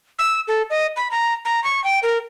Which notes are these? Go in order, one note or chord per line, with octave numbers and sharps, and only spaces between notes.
E6
A4
D#5
B5
A#5
A#5
C#6
G5
A#4